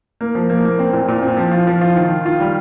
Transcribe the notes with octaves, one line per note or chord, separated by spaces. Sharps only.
A#3
F3
A#3
A#3
C4
A#2
A#2
C4
F3
F4
F3
F4
D#3
D#3
F4
G3